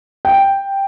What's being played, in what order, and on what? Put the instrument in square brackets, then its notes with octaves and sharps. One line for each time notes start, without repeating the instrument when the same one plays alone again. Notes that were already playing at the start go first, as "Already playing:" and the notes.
[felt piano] G5